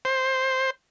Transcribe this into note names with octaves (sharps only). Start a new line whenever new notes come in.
C5